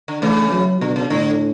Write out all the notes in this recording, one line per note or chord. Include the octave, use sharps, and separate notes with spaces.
D3
C#3 E3 A3
F#3
B2 D3
C#3
A2 D3